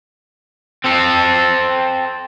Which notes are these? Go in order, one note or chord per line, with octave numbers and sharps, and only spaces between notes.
C4 A4